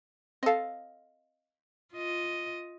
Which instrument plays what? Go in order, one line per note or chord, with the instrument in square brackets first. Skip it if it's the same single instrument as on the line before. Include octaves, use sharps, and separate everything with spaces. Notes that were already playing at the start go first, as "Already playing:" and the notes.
[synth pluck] C4 A4 [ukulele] D#5 F5
[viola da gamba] F4 D#5